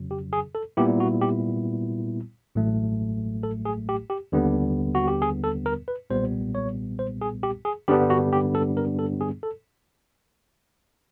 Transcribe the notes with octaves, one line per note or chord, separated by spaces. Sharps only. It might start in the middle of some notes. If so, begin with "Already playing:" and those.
Already playing: F2 C#3 F#3
G4
G#4
A4
A#2 G3 B3 E4 G4
F#4
G4
A1 A2 F#3 A3
A4
G#4
G4
G4
D#2 D3 G3 B3
F#4
G4
G#4
A4
A#4
B4
B1 A#2 G3 B3 C5
C#5
C5
G#4
G4
G#4
G2 D3 G3 B3 D4 G4
F#4
G4
A4
A#4
A4
G#4
A4